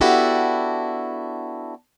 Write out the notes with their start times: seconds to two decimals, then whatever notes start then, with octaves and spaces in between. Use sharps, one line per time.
0.01 B3 D4 E4 F#4 G4 A4